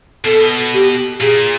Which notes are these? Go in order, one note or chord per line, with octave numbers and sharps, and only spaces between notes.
B2 A4
G4
A#2 G#4